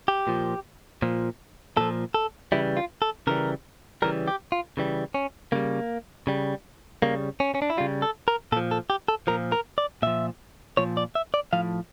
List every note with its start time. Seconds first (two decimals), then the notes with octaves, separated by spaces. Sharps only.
0.08 G4
0.27 A#2 F3
1.02 A#2 F3
1.77 A#2 F3 A4
2.14 A4
2.52 C#3 E3 G3 E4
2.77 F4
3.02 A4
3.27 C#3 E3 G3 A#4
4.02 C#3 E3 G3 A#4
4.28 G4
4.52 F4
4.77 C#3 E3 G3
5.14 C#4
5.52 C#3 G3 A#3
6.27 C#3 G3
7.02 C#3 G3 A#3
7.40 C#4
7.55 C#4
7.62 D4
7.70 E4
7.78 G3 F4
7.81 C#3
8.02 A4
8.28 A#4
8.52 A#2 A4
8.57 F3
8.71 A4
8.90 G4
9.08 A4
9.27 A#2 F3 A#4
9.52 A#4
9.78 D5
10.02 A#2 F3 E5
10.77 A#2 F3 C#5
10.97 D5
11.15 E5
11.34 D5
11.53 A2 F3 F5